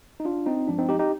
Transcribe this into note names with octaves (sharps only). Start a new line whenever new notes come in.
D#4
D4 F4
C4 D#4
G2 F3 G#3 D4
C4 D#4
D#4 G4
D#4 G4